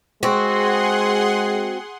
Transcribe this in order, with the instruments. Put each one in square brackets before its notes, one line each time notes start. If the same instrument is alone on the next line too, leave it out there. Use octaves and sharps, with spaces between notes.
[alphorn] G#3 [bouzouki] C4 F#4 [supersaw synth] G#4 F#5 C6